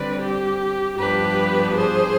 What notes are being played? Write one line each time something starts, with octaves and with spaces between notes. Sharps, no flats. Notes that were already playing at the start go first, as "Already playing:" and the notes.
Already playing: D3 G3 C4 B4 D5
G4
G2 F3 B3 D4 G4 B4
G#4 C5